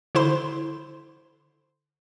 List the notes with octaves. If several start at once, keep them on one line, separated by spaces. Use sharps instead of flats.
D3 E4 C5 C6